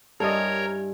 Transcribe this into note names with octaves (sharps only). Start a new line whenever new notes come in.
G2 E4 A4 A#4 C#5 D#5 G#5 A#5